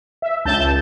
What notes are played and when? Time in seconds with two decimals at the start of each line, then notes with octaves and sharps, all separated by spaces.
0.22 E5
0.45 C#2 A5 G6